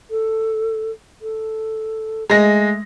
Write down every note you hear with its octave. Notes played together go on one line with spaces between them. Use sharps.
A4
A4
G#3 A3 A#6